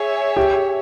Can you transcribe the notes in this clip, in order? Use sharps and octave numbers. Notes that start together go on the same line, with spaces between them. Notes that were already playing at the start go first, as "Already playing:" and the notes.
Already playing: G#4 C#5 E5
G4